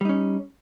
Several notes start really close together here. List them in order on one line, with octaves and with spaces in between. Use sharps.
G3 D#4 C#4